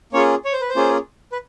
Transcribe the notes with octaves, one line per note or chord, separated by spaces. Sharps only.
A#3 C#4 F4 G#4 C#5
C#5
C5
B4
C5
A#3 C#4 F4 G#4
B4